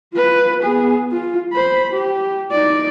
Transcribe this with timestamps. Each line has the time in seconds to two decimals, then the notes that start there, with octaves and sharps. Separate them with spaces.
0.14 F4 B4
0.63 B3 G#4
1.12 F4
1.52 C5 B5
1.92 G4
2.51 D#4 D5